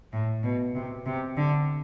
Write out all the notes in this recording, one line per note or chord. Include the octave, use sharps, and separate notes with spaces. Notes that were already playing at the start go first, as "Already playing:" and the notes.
A2
B2
C3
C3
D3